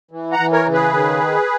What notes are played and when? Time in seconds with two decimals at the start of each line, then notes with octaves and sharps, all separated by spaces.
0.11 E3
0.32 F#5 A#5
0.39 E3
0.52 A#4 C#5
0.66 C#3
0.73 G#4 B4
0.93 D#3